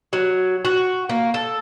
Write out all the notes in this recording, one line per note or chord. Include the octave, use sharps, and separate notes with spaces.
F#3
F#4
A#3
A4